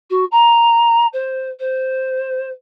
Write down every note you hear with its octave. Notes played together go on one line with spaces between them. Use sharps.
F#4
A#5
C5
C5